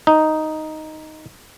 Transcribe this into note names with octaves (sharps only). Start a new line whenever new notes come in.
D#4